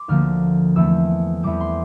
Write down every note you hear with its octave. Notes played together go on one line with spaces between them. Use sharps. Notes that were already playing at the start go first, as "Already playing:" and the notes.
Already playing: C6 D6
D2 D3 F3 A#3 F6
E2 E3 A3 C4 E6
E2 E3 G3 C4 D6
C6